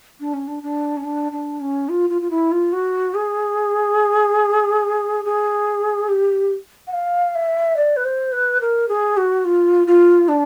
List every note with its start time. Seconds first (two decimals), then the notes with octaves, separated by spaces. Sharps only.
0.20 D4
0.34 C#4
0.47 D4
0.63 D4
0.97 C#4
1.04 D4
1.32 D4
1.60 C#4
1.89 F4
2.10 F4
2.22 F4
2.30 E4
2.52 F4
2.73 F#4
3.14 G#4
5.25 G#4
6.08 G4
6.87 F#5
6.93 F5
7.35 E5
7.77 D5
7.96 B4
8.05 C5
8.32 B4
8.61 A#4
8.88 G#4
9.17 F#4
9.45 F4
9.87 F4
10.28 D4